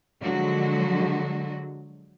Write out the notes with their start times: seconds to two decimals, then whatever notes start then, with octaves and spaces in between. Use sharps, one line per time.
0.22 D3 F3 F#3 G#3 F#4